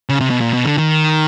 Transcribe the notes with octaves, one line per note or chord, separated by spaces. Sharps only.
C#3
C3
B2
A#2
B2
D3
D#3